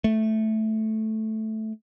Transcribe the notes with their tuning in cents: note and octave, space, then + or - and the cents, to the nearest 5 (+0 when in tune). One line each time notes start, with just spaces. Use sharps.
A3 -5